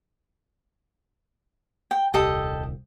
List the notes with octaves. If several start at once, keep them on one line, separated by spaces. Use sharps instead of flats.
G5
D#1 C2 G4 A4 D#5